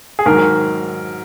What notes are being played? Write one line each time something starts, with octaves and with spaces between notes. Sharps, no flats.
G#4
G#2 D#3 F#3 A#4